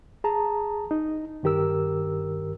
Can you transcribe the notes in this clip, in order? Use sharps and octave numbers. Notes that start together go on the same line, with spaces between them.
G#4 A5 A#5
D#4
G2 D#3 G4 A#4 E6